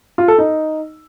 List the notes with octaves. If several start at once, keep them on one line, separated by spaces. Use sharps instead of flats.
F4
A4
D#4